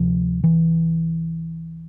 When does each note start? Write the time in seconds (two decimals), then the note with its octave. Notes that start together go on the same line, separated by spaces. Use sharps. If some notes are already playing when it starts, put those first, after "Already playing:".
Already playing: D2 C3 F3
0.44 E3